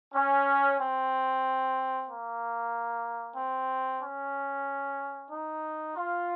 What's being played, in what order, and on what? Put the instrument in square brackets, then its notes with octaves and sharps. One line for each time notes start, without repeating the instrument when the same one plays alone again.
[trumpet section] C#4
C4
A#3
C4
C#4
D#4
F4